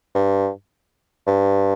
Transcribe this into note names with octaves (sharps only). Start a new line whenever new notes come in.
G2
G2